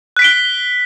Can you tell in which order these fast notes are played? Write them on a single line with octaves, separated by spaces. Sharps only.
F#6 B6 D7 G7